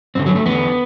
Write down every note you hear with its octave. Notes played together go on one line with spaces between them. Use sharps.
G2 D3 C4
F#3
A3
E2 D3 B3